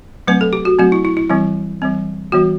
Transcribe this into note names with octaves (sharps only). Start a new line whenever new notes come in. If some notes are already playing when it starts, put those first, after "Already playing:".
F#3 A3 C4 B4
A4
G4
F#4
F#3 A3 C4 F#4
E4
E4
E4
E3 G3 C4 E4
E3 G3 C4
E3 G3 B3 F#4